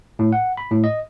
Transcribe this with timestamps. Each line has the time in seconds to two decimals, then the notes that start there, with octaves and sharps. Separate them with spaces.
0.19 A2
0.33 F#5
0.57 B5
0.71 A2
0.84 D#5